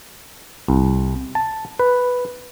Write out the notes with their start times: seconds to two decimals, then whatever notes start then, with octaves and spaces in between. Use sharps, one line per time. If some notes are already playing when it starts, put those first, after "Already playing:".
0.68 C2
1.35 A5
1.79 B4